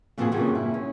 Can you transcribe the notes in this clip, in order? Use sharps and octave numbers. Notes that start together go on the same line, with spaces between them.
A#2 E3 F3 C4 F#4 G#4
G2 A#2 C#3 F#3
E4
C#4